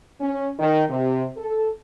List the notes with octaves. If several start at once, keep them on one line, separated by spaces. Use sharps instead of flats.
C#4
D#3
C3
A4